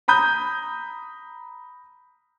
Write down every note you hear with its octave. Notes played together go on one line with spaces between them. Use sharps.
A#5 B5 D#6 G6